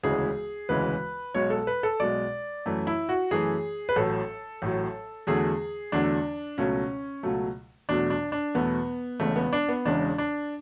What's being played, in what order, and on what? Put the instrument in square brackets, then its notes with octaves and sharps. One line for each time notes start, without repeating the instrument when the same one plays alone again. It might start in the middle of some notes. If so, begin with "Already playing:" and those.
[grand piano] E1 D2 C#3 E3 G#3 G#4
E1 D2 C#3 E3 G#3 B4
B1 B2 G#3 C#5
A4
B4
A4
B1 B2 G#3 D5
F#2 E3 A3
E4
F#4
F#2 E3 A3 G#4
B4
A1 A2 F#3 A4
A1 A2 F#3
E2 D3 F#3 A3 G#4
E2 D3 F#3 A3 D4
C#2 B2 F#3 A3 C#4
C#2 B2 F#3 A3
E2 B2 F#3 A3 D4
D4
D4
E2 B2 F#3 A3 B3
E1 E2 C#3 G#3 A3
B3
D4
B3
E1 E2 C#3 G#3 D4
D4